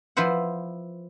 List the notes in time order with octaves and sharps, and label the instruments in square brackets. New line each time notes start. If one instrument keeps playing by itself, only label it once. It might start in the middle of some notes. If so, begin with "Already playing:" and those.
[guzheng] F3 E4 B4 C5 F#5